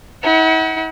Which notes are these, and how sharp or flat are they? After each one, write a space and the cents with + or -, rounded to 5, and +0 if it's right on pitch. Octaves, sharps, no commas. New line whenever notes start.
E4 -45 F#5 +20